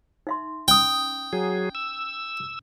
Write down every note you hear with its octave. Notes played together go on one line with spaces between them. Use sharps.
D#4 E5 C6
C#4 G5 D#6
F#3 G#4
E6